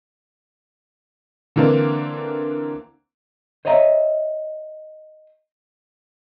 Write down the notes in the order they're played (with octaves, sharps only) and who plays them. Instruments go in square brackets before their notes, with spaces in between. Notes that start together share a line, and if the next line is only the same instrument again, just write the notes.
[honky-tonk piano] D3 E3 A#3 C4 D4
[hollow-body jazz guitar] C5 C#5 D#5 E5 A#5